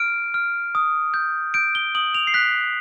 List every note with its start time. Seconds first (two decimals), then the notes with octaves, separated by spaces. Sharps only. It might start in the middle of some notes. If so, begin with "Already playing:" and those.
Already playing: F6 D7
0.34 F6
0.75 D#6
1.14 G6
1.54 G6 D7
1.75 G7
1.95 D#6 F#7
2.15 F7
2.27 C7
2.34 F#6 B6